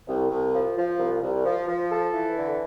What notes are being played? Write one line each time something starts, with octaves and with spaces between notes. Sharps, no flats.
C2
C2
F3
F3
C2
C2
F3
F3
A4
E3
D3